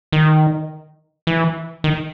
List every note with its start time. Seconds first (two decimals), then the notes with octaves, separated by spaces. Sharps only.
0.12 D#3
1.27 E3
1.84 D#3